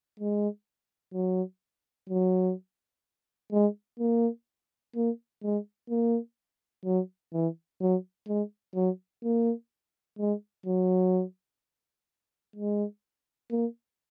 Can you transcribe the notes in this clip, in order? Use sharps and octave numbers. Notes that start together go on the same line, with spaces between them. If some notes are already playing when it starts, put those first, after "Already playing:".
G#3
F#3
F#3
G#3
A#3
A#3
G#3
A#3
F#3
E3
F#3
G#3
F#3
A#3
G#3
F#3
G#3
A#3